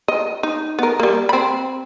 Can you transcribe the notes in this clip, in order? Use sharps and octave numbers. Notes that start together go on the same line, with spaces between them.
D#5
D#4
B3 A#4
G3 A#3
C4 B5